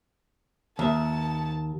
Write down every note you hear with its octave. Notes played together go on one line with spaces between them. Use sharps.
D#2 E5 A5